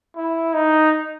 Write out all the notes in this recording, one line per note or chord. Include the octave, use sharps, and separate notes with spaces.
E4
D#4